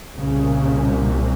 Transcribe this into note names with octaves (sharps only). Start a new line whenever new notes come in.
C2 A#2 C#3